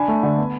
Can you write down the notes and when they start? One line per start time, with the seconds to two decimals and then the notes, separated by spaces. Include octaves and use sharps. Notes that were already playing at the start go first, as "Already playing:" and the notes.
Already playing: D4 G#5 B5
0.08 A3
0.23 D3
0.38 B3